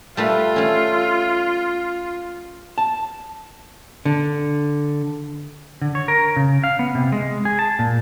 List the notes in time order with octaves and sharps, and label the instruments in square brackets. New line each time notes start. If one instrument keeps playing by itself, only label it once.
[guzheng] G3 A3 B4 [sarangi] F4
[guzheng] A3 C#4
[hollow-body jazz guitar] A5
D3
[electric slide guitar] D3
C#5
A#4
C#3
F5
B3
C3
G#3
G#4
A5
A#2